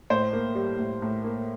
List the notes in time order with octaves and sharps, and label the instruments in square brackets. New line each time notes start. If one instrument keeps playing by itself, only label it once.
[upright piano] A2 C5
A#3
G3
A2
A2
A#3